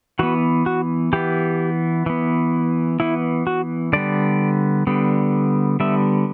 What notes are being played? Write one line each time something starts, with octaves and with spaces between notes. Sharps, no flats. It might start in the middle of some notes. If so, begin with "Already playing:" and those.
E3 B3 F#4
F#4
E3 B3 G4
E3 B3
E3 B3 E4
F#4
D3 G3 B3 D5
D3 G3 B3
D3 G3 B3 E5